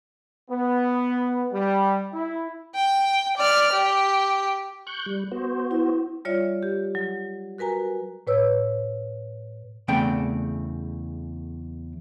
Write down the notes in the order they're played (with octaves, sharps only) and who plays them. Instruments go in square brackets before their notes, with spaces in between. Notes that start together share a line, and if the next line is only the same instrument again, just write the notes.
[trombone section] B3
G3
E4
[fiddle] G5
D5 F6
G4
[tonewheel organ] C#6 F#6 G6
G3
B3 F#4 C5
[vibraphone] E4
[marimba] G3 F4 C#5 D5 E5
G4
F#3
F#4 A#4 B4 G#5 A#5
A2 B4 C#5 E6
[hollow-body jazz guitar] E2 C#3 A3 C4 D5 G5